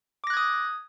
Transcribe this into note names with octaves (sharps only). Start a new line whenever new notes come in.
D6 D#6 F#6 G#6 A#6